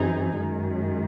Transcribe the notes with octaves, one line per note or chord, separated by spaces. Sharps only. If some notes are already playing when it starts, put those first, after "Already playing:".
Already playing: F#2 E3 C4 D#4 G#4
F#2 D#3 G#3